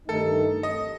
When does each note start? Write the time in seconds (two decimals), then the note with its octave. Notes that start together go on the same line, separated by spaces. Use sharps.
0.08 G2 D#3 A3 D#4 A4
0.63 D#5